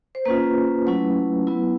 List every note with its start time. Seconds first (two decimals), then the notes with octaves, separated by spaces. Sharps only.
0.15 C5
0.25 A#3 C#4 F4 B4
0.87 F#3 A3 C#4 E4
1.47 F#3 B3 E4